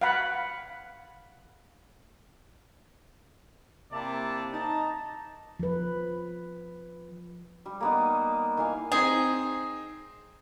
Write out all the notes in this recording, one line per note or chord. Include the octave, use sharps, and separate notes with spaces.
F5 F#5 B5
C3 A#3 E4 D5 E5 A5
D#4 A5 A#5
F3 B4
G3
A#3 B3 D#4
D#3 E3 F5 G#5
C4 D#4 G#4